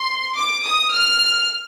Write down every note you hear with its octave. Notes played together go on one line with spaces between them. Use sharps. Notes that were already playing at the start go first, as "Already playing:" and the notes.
Already playing: C6
D6
D#6
F6